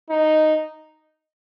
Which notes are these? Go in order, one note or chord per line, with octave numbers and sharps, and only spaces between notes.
D#4